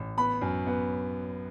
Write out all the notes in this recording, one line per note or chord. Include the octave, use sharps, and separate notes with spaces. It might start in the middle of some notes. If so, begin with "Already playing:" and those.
Already playing: A1
B3 B5
F#2
B3